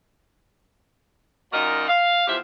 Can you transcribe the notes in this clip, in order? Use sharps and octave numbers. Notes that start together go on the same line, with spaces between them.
F#2 A#2 D#4 F#4 A#4 D#5
F5
E2 F3 F4 G4 C5 E5